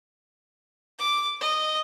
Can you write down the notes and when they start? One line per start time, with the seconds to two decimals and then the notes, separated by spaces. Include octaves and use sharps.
0.99 D6
1.41 D#5